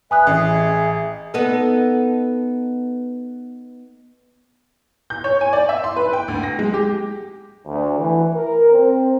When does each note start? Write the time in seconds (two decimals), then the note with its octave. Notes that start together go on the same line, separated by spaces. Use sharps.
0.11 B4 E5 G#5 D#6 F#6
0.27 A1 G#4
1.34 B3 D#4 A4
5.10 G6
5.24 C#5
5.41 G#5
5.53 D5
5.69 E5
5.84 C6
5.96 B4
6.13 G5
6.28 D2
6.43 A#6
6.59 G#3
6.74 G4
7.67 D2
7.98 E3
8.35 A#4
8.72 C4